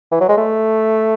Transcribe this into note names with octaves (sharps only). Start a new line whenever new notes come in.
E3
F#3
G#3
A3